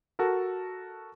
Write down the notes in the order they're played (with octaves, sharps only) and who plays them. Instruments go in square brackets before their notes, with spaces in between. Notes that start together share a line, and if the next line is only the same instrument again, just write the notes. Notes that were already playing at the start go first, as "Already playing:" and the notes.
[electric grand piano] F#4 A4 A#4